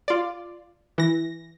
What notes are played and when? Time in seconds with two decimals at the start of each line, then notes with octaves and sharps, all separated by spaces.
0.08 F4 D5
0.98 E3 A#6